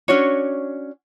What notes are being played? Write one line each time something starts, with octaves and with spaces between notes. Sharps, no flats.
C#4 D4 F#4 C#5